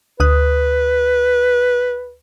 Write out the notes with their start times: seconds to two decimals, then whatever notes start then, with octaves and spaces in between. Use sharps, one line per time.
0.20 D2 B4 D#6 F#6